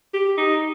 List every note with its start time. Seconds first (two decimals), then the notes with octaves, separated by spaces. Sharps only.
0.14 G4
0.37 D#4